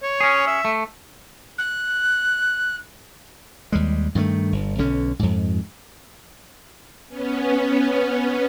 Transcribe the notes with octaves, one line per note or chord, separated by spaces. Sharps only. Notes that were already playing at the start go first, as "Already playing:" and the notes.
C#5
C#4 G#4
E5
A3
F#6
D#2 G3 G#3
G2 D#3 F#3 A3
G1
B1 D3 C#4
F2 G#2
B3 C#4